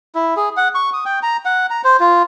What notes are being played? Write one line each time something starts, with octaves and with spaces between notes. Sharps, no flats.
E4
G#4
F#5
C#6
D#6
G5
A#5
F#5
A#5
C5
F4